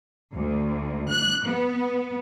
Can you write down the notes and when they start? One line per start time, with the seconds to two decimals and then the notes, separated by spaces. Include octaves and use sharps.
0.34 D2
1.09 F#6
1.46 B3